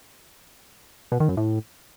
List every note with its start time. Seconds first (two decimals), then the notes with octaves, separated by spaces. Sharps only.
1.12 B2
1.20 D#3
1.29 F#2
1.37 A2